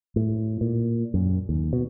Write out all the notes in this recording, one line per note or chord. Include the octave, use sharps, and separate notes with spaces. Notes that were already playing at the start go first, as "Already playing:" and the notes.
A2
A#2
F#2
D#2
B2